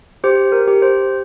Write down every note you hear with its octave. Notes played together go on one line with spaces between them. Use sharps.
G4 C5
A#4
G4
C5